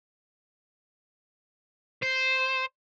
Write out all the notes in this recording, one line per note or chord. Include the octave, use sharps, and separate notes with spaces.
C5